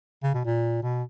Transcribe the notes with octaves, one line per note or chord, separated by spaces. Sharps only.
C#3
B2
A#2
B2